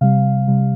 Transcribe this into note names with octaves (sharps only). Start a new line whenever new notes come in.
C3 G3 F5
C3 G3